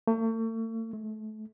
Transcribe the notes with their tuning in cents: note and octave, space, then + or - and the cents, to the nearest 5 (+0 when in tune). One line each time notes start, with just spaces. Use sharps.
A3 +40
A3 -30